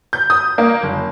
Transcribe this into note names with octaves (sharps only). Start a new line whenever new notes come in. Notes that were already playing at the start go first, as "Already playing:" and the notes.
G6
D#6
A#3
F#1